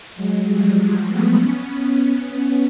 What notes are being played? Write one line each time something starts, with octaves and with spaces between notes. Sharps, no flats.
F#3 G#3
F3 G3
F#3 G#3
A3 B3
B3 C#4